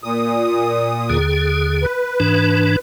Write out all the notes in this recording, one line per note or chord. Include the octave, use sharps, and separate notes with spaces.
A#2 D#6
D#2 D3 G#4
B4
G#2 E3 D4